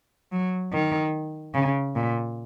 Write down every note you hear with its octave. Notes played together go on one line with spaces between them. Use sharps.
F#3
D#3
C#3
A#2